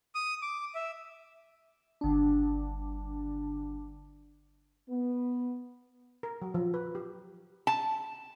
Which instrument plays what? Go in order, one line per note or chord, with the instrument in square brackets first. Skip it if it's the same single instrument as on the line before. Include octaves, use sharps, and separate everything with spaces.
[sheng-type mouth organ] D#6
D6
E5
[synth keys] G1 D4
[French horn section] B3
[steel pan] A#4
F#3
F3
B4
G4
[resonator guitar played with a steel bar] A5